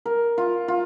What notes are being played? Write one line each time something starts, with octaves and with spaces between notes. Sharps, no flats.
A#4
F4
F4